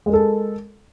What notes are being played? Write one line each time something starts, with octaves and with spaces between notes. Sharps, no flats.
G#3 A4 A#4